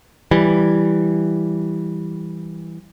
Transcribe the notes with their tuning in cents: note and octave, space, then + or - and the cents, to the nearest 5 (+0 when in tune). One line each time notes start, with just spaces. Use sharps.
E3 +0 G3 +0